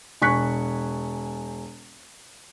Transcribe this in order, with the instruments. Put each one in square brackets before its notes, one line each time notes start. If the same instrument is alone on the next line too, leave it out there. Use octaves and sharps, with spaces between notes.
[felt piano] E1 G#5 C#6 F#6 B6